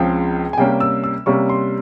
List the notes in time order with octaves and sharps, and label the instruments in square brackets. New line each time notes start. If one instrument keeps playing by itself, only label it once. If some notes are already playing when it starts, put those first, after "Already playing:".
Already playing: [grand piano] C#2 C#3 F3 C4 G5
G#5
C3 G3 A#3 C#4 G5
E6
E6
C3 G3 A#3 C#4 C#6
C6